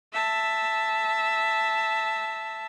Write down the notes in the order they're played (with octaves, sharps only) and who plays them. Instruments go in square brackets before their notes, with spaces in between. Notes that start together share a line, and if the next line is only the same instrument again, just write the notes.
[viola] E5 A5